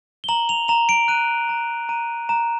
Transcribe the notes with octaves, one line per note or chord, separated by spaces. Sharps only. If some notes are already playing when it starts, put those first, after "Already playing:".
G7
A#5 F#7
F7
A#5 F7
D7
F#6 D#7
A#5
A#5 D#7
A#5 E7